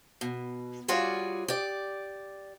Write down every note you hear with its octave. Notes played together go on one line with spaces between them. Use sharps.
B2
G3 F4 F#4 G#4 C#5 D5
G4 D5